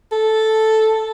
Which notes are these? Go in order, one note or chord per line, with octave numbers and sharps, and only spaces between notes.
A4